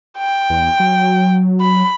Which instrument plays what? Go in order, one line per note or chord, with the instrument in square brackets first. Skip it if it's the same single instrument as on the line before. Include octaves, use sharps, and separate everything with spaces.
[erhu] G5
[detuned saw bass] E2
F#3
[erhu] B5